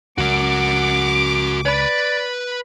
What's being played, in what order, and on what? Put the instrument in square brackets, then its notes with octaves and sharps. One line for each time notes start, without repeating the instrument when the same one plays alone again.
[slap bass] C#2 [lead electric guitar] F#4 A#4 [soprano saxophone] F#5 [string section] D6
[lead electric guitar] B4 B5 [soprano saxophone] D5